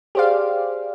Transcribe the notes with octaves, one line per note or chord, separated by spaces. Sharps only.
G4 G#4 C5 D5 F5